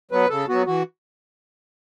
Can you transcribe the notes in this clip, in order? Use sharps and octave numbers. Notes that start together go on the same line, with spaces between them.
F#3 B3 B4
C#3 A4
F#3 B3 F#4
E3 F#4